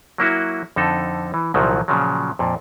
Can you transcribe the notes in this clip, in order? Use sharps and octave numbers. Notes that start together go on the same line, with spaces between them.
F#3 A#3 E4 F#4
F2 D3 D#4 A4
E3
C2 A#2 D#3 F3 F#3
A#2 C#3 F3 F#3
F2 A#2